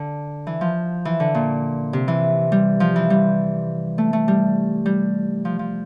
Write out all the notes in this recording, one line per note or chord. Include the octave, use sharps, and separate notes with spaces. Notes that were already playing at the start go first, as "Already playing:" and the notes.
Already playing: D3
E3
F3
E3
D3
A#2
C3
E3
G3
F3
E3
G3
A3
A3
G3
G3
F3
F3